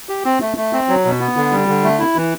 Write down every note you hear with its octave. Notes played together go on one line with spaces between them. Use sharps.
G4
C4
A3
A3
C4
F#3
B2
B3
D3
G3
D3
A3
E4
E3